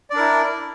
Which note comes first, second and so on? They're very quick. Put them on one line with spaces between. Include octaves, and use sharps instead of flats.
D5 D4 A#4 E4